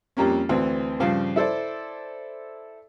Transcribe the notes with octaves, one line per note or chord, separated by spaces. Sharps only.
F2 G3 A#3 C#4
D2 E3 C4
G2 C#3 F3 F5
E4 A4 C5 D5